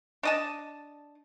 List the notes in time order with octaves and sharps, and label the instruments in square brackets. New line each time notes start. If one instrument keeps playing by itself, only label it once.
[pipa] D4 D#5 A5